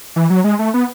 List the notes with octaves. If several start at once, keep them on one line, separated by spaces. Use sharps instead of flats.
E3
F#3
G#3
A3
B3